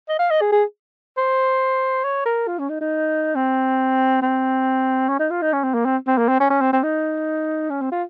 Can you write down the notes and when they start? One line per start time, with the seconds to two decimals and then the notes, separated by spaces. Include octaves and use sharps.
0.08 D#5
0.19 F5
0.30 D#5
0.41 G#4
0.52 G#4
1.17 C5
2.04 C#5
2.26 A#4
2.47 F4
2.59 C#4
2.70 D#4
2.81 D#4
3.35 C4
4.22 C4
5.09 C#4
5.19 D#4
5.31 F4
5.42 D#4
5.53 C#4
5.64 C4
5.74 A#3
5.85 C4
6.07 C4
6.18 A#3
6.28 C4
6.40 C#4
6.50 C#4
6.61 C4
6.73 C4
6.83 D#4
7.70 C#4
7.81 C4
7.92 F4